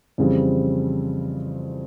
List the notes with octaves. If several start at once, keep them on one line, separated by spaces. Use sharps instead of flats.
F2 C#3 E3 G3 C4